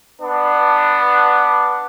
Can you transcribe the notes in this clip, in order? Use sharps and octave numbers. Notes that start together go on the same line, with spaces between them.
B3 D4